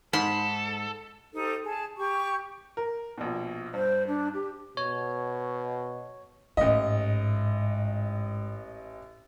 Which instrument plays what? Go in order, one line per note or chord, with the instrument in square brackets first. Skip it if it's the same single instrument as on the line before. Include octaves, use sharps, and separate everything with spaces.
[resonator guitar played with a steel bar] G#2 [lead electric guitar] A4 [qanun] B5 C6
[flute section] D#4 G4 A4 C5
G#4 A5
G4 C#6
[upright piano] A#4
A#1 B2
[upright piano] G2 [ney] C5
[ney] D4
G4
[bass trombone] B2 [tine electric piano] C#5
[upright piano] A1 D#5 [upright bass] G#2